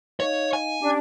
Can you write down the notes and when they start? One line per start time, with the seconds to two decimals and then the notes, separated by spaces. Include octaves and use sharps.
0.20 D#4 C#5 D#5 F5
0.53 G#5
0.80 C#4 D4 G4 D5